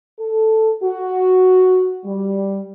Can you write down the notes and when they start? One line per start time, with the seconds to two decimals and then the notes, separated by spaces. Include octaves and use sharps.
0.19 A4
0.82 F#4
2.04 G3